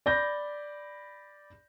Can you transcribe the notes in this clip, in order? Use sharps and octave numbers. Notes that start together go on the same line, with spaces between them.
D5 B5 G6 A#6